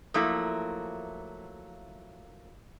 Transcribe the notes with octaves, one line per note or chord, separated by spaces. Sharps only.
F3 F#3 A3 A#3 E4